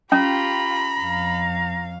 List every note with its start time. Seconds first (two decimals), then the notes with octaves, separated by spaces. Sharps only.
0.12 C#4 F4 G4 A#5 B5
1.00 F2 F5